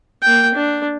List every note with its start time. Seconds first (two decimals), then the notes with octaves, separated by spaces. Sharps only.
0.22 A#3 G5
0.54 D4